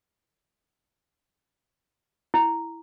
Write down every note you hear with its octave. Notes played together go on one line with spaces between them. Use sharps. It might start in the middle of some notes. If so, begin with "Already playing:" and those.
E4